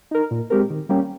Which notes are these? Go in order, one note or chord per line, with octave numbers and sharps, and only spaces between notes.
D#4 A#4
A#2
G#3 C4 G4 A#4
D#3
G3 A#3 C#4 G4